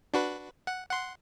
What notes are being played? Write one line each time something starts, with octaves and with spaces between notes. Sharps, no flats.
D4 F#4 B4
F#5
F#5 C6